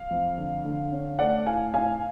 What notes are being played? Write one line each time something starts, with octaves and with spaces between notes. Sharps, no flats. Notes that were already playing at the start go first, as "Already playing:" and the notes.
Already playing: F5
F2
D3
D3
C#4
A3 D5 F#5
A2 F5 G#5
A2 F5 G#5